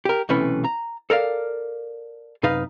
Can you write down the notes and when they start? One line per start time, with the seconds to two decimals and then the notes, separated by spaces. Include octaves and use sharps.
0.05 G4 A#4
0.29 B1 C3 E3 A3 C#4 B4
0.64 A#5
1.10 A4 A#4 D5 F5
2.43 F#2 C3 D#4 B4 F5